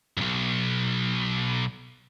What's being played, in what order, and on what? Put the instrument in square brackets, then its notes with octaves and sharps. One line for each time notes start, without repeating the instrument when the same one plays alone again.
[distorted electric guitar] B1 F#2